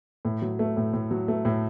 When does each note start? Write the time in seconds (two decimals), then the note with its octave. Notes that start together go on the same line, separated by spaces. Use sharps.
0.25 A2
0.42 F#3
0.59 A3
0.77 A2
0.93 A2
1.11 F#3
1.28 A3
1.45 A2